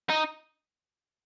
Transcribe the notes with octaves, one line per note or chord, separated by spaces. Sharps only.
D#4